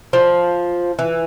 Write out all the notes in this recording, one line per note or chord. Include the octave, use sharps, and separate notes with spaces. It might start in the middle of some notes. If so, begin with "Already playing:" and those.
F3
E3